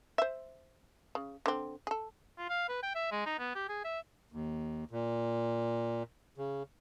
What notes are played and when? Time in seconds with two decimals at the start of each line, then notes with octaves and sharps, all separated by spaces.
0.18 C5 E5
1.15 C#3
1.46 D3 C4
1.87 G#4 A4
2.38 F4
2.50 F5
2.69 B4
2.83 G5
2.95 E5
3.11 G#3
3.26 D#4
3.39 B3
3.55 G4
3.69 G#4
3.84 E5
4.32 D#2
4.91 A#2
6.38 C#3